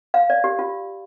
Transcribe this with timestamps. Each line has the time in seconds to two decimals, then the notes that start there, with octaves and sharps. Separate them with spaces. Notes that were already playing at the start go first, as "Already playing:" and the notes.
0.14 F5
0.30 D5
0.44 G4
0.59 F4